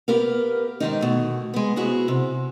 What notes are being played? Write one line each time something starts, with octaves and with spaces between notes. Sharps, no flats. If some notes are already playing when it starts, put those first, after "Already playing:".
B3 G4 A#4 B4 F5
G#2 D#3 D#4
B2 A3
G#3 B3
C3 B3 E4 F#4 G#4
C3